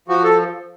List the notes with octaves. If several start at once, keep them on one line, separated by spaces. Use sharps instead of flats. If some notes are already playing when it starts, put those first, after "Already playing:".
F3 F#4
A4